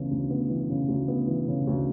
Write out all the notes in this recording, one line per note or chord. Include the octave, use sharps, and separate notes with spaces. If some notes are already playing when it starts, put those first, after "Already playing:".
Already playing: D2 C#3 E3 B3
D2
B3
E3
C#3
D2
B3
E3
C#3
D2